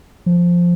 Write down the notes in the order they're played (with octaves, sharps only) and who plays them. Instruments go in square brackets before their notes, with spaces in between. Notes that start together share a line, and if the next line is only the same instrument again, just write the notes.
[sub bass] F3